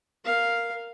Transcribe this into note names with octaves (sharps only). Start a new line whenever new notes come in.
A#4 F5